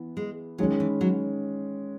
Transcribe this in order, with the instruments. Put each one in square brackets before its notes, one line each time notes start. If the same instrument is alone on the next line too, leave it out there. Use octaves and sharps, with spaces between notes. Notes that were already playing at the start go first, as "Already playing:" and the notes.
Already playing: [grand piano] E3 B3
[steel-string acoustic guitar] G#3
[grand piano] D#3 G#3 C#4 [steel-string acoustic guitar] F#3
[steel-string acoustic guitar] E3
F#3